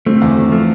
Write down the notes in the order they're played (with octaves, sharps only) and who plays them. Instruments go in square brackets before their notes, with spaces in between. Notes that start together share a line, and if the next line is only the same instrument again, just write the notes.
[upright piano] D3 [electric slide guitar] A3 C4
[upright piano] E2
D3
[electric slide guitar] F3 A3